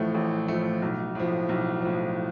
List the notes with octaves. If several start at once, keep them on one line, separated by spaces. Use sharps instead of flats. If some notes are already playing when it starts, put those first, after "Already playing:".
Already playing: A1 A2 F3 A3
A1
A2 F3 A3
B1
A2 F3
B1
A2 F3